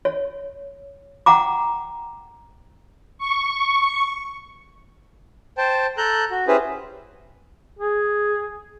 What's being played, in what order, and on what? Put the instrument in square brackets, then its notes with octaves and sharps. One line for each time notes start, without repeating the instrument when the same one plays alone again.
[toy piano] C#5
F#5 G5 A#5 D6
[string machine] C#6
[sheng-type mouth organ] C5 G5 A5
A4 A#5 F#6 G6
F#4
C#4 E4 G4 G#4 B4 C5
[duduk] G#4